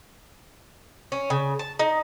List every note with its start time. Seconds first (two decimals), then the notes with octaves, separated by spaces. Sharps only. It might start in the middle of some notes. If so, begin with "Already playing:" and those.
1.12 C#4
1.30 C#3
1.59 A5
1.79 D#4